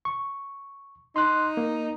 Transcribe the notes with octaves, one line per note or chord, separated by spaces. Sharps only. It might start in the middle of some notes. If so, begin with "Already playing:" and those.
C#6
D#4 C6 F#6
A#3